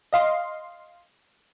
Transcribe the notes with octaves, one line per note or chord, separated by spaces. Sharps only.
D#5 F5 C6